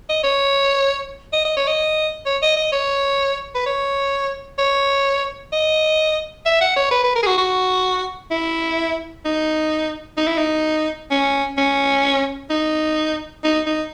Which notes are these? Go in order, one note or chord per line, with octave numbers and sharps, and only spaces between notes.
D#5
C#5
D#5
D#5
C#5
D#5
C#5
D#5
D#5
C#5
B4
C#5
C#5
D#5
E5
F#5
C#5
B4
B4
A#4
G#4
F#4
F#4
E4
D#4
D#4
E4
D#4
C#4
C#4
D#4
D#4
D#4